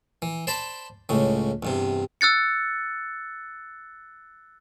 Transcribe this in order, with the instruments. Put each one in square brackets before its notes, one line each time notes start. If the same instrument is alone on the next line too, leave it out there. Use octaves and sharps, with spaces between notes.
[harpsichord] E3
C5 D5 A5 B5
C#2 A2 C#3
E2 G2 C3
[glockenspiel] E6 F#6 A6 C#7